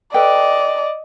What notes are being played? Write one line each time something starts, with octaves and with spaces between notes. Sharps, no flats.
A4 B4 D5 D#5 G5